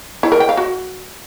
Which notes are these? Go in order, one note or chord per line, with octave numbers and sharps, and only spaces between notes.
E4
A#4
G5
F5
F#4